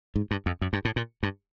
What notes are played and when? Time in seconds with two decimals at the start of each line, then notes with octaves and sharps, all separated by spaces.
0.16 G#2
0.31 G2
0.46 F2
0.61 F#2
0.73 G2
0.85 A2
0.96 A#2
1.23 G2